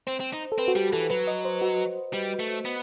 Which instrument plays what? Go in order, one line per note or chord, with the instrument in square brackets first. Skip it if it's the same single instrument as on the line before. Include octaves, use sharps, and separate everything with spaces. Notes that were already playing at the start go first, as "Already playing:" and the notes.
[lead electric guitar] C4 [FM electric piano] C5
[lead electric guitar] C4
D#4
[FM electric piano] A4
[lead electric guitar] C4 [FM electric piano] B4
[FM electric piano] F#4
[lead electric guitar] G3 [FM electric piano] G4
[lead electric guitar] E3 [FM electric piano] A4
[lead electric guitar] F#3 [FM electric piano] B4
[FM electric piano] D#5
C5
F#4
[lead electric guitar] G3
A3
B3